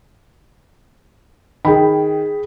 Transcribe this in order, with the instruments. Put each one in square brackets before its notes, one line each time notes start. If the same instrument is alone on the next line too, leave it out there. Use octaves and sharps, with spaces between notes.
[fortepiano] D#3 [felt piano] G#4 G5 B5